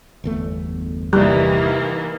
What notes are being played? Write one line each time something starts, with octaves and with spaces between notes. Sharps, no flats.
G1 E2 A3
C3 D#3 E3 G3 A#3